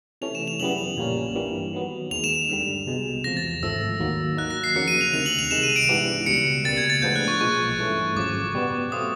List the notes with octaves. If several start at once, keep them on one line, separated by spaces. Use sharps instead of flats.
C3 E3 A3 C#4 F7
E7
F7
F#2 C#3 E3 G3 B3 F#7
A#1 A#2 G3 A#3 C#4
G2 E3 G3 A#3
D#3 F#3 B3
D#2 D#3 G#3 F7
E7
G2 D3 G3
C2 B2 G#3
E2 C3 F3 A#6
A6
G#1 G#2 F3 A3 E6
D#2 D#3 F#3 A#3
D#3 F#3 A#3 D#4 F#6
A#6
C7
F2 C#3 F#3 A#3 C#7
D#7
F7
D2 C3 D#3 F7
F#7
F7
C2 C3 D#3 G#3 E7
D#7
D7
G#2 E3 G3 B3 D4
C#2 B2 G3 C#7
C#2 B2 G3 A#3 A6
G#6
A6
A2 F3 G#3 B3 D4 G6
F#6
C#6
B1 A#2 F3 G#3 C#6
G2 E3 A3 C#4
G#1 F#2 C#3 F3 D6
B2 G3 B3
B2 F#3 A3 C4 F4 D#6